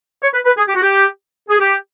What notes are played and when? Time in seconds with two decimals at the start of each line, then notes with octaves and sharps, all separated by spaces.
0.22 C#5
0.33 B4
0.45 B4
0.57 G#4
0.67 G4
0.75 F#4
0.82 G4
1.49 G#4
1.59 G4